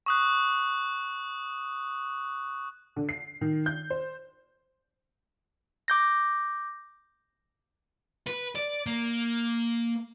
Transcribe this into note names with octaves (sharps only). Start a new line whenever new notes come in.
C#6 D#6 F#6
D3
C7
D#3
G6
C5
D6 G6 A#6
B4
D5
A#3